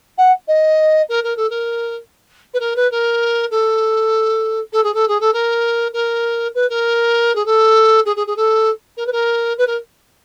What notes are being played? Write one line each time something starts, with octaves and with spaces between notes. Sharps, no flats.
F#5
D#5
A#4
A#4
A4
A#4
B4
A#4
B4
A#4
A4
A4
G#4
A4
G#4
A4
A#4
A#4
B4
A#4
G#4
A4
G#4
G#4
G#4
A4
A#4
B4
A#4
B4
A#4